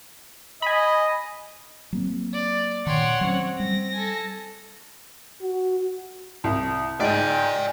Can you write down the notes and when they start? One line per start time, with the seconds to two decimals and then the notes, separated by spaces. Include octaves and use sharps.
0.62 D#5 G#5 B5
1.93 F#3 A#3 C4
2.33 D5
2.87 A#2 D#3 C#5 F#5 G5 C6
3.21 F#3 C4 C#4
3.60 G3 A#6
3.92 A4 G#5
5.42 F#4
6.44 C2
7.00 G#2 D5 G5 G#5